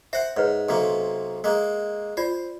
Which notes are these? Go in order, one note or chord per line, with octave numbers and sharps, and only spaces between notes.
C5 E5 F#5
G#2 B4 C#5
B1 C3 A#3
G#3 A#3
F4 C5 D5